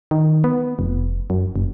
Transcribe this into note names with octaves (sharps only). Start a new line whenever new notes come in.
D#3
B3
F1
F#2
F#1